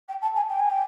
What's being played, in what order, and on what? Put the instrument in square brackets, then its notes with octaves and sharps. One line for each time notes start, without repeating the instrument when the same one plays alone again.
[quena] G5
A5
G#5
G5
G#5
G5